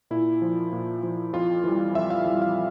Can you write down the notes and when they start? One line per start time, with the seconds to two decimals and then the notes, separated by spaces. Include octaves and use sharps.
0.11 A#2 E4
0.42 F3
0.73 A#2
1.03 F3
1.33 F2 F4
1.64 E3 G3
1.95 F2 E5
2.10 F5
2.26 E3 G3
2.42 F5